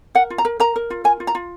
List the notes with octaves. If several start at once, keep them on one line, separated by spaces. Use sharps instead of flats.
A#4 F#5
F4
A#5
A#4
A#4 A#5
A#4
F4
A#4 G#5
F4
A#5
F4